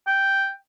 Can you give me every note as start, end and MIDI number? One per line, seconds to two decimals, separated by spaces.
0.07 0.51 79